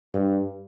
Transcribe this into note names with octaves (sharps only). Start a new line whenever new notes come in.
G2